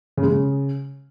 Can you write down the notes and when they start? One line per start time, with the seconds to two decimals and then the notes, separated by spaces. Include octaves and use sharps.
0.17 C#3
0.23 G#3
0.28 C#3